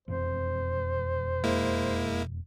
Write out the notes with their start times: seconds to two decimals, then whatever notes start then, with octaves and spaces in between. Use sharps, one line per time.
0.08 E1 F2 C4 C5
1.44 G#3 A#3 E4